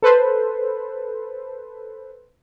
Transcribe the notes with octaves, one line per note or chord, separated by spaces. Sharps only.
A4 B4 C5